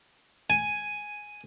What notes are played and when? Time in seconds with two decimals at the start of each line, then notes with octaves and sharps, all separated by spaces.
0.50 G#5